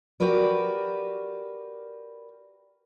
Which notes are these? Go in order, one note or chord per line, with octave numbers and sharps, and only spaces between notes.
F#4 G4 A#4 B4 D5